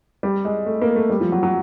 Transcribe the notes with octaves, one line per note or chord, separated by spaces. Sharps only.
G3
G#3
A3
A#3
A3
G3
F3
F#3
F#3